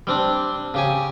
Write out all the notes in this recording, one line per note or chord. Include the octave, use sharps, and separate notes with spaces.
G3 C4 D4
C#3 G4 G#5